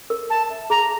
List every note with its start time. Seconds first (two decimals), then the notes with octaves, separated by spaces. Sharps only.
0.10 A#4
0.30 G#5 A5
0.50 E5
0.70 G#4 A#5